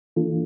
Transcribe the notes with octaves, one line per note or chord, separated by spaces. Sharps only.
E3 A#3 D4 F4 A4